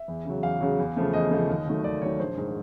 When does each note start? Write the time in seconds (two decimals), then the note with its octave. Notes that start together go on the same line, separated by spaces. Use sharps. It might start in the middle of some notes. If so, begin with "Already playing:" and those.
Already playing: E5
0.08 E2
0.25 C#3 F#3
0.43 E2 F5
0.61 C#3 F#3
0.79 E2
0.97 C#3 F3 A3
1.13 E2 D#5
1.31 C#3 F3 A3
1.49 D#2
1.67 D#3 F#3 A3
1.84 D#2 D5
2.02 D#3 F#3 A3 C#5
2.19 A#1 C5
2.37 G#2 D#3